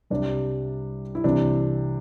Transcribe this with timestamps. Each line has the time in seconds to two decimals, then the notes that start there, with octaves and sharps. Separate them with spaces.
0.10 C2 C3 G3 D4
1.15 E4
1.24 C2 C3 E3 C4 D4